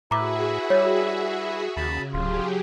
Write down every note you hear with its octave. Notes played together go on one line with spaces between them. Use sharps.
A2 E4 F#4 G#4 B4 E5 A#5 D6
G3 C#5
D#2 C#3 A5 B5
D1 F#3 F4 G4 G#4